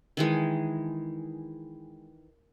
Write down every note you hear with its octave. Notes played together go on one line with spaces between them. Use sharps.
D#3 E3 G#3